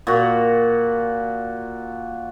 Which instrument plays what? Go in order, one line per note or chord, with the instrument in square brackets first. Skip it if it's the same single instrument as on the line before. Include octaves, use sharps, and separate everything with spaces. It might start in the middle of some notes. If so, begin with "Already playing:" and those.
[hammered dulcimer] A#2 F#4